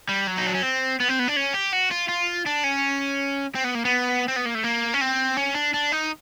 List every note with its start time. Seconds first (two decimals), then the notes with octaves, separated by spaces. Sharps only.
0.09 G3
0.27 F#3
0.38 D#4
0.47 D4
0.55 C#4
0.63 C4
1.00 B3
1.09 C4
1.19 B3
1.28 D4
1.37 C#4
1.54 G4
1.73 F#4
1.91 F4
2.09 F4
2.46 D4
2.64 C#4
3.55 C4
3.64 B3
3.75 A#3
3.85 B3
4.28 C4
4.36 B3
4.46 A#3
4.55 A3
4.64 A#3
4.94 C#4
5.01 C4
5.37 C#4
5.55 D4
5.74 D4
5.92 D#4